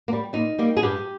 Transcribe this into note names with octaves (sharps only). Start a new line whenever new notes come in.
A#3
G3
A#2 D#4
G3 A#3
G#4
G2 G4